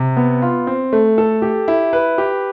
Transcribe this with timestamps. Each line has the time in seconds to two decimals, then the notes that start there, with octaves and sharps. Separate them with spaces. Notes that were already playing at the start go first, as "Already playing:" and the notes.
Already playing: C3
0.17 B3
0.42 F4
0.67 C4
0.93 A3
1.18 A4
1.42 G4
1.68 E4
1.93 B4
2.18 G4